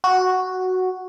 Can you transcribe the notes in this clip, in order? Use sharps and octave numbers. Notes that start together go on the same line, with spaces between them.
F#4